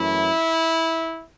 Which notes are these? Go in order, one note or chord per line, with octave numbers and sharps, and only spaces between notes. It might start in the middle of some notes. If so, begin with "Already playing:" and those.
Already playing: F#2 E3 A3 E4